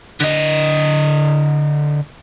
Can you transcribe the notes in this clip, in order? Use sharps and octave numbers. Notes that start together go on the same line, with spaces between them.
D3 D#5